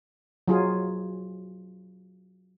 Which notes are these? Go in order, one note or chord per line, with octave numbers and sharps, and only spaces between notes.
F#3 F4 G#4